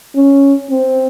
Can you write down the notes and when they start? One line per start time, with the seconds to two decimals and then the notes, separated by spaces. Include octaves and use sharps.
0.16 C#4
0.70 C4